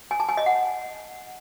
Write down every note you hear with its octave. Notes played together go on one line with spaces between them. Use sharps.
G#5
A5
G#5
D#5
F#5